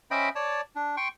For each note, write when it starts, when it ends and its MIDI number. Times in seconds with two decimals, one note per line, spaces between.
0.11 0.29 61
0.11 0.29 72
0.11 0.29 75
0.11 0.29 76
0.11 0.29 79
0.11 0.29 83
0.35 0.61 73
0.35 0.61 74
0.35 0.61 81
0.76 0.96 62
0.97 1.08 79
0.97 1.08 84
0.97 1.08 85